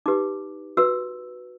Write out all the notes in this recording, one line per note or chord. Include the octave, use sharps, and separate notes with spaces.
D#4 G4 B4 D6
F#4 B4 E6